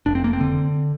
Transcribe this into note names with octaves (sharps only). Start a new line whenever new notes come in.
F1 D4
C4
A#3
C4
D3